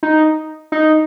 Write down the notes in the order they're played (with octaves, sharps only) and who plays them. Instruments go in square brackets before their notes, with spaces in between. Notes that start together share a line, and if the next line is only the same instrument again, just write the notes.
[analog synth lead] D#4
D#4